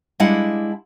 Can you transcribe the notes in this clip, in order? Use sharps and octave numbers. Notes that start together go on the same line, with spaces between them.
G3 G#3 D4 E4 F5 F#5